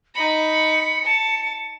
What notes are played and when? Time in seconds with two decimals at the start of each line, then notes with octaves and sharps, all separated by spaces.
0.15 D#4 B5 C#7
1.04 A5